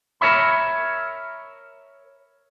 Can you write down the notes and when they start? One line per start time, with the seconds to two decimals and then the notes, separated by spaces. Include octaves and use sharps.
0.21 A#4 C#5 E5 B5